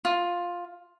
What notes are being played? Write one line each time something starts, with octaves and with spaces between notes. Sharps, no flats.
F4